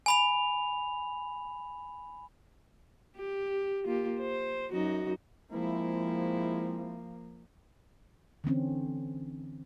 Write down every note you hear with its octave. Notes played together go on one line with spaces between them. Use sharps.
G#5 B5 F7
G4
A#3 F4 G4
C5
F#2 D#4 F#4
F3 G#3 A#3 C4 E4
D3 E3 C4 C#4